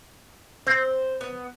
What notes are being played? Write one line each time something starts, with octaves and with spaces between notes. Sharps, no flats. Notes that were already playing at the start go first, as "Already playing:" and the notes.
C4 C5
B3